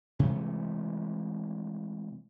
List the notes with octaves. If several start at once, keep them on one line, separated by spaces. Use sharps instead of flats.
C3 E3 G#3 A3